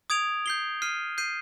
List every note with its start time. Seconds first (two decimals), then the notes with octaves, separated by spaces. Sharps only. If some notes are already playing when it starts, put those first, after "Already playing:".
0.10 D#6 G#6 D7 F7
0.46 G6 C7 G7
0.82 F6 C7 D#7
1.18 G6 C7 D#7